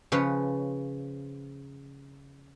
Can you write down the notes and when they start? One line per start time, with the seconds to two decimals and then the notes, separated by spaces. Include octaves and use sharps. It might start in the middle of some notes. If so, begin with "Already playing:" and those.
0.12 C#3 F3 B4 C#5